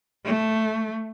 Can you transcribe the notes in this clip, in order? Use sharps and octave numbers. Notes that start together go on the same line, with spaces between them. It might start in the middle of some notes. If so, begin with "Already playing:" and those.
A3